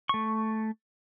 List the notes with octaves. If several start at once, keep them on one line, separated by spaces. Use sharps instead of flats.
A3 C#6